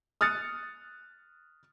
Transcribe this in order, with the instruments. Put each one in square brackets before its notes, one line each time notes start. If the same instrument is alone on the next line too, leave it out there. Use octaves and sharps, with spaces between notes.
[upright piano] D#6 F6 F#6 A6 C#7